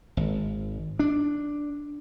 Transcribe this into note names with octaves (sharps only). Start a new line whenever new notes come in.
G#1
D4